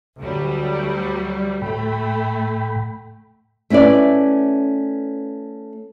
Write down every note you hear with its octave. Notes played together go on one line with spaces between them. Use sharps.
D2 F#3 G3
A2 A3 G5 B5
A3 C#4 E4 B4 D5